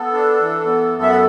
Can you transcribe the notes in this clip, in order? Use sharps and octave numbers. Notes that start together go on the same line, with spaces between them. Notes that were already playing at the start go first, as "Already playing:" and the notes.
Already playing: B3 A4
D4
E3
B3
F#2
E5
F#5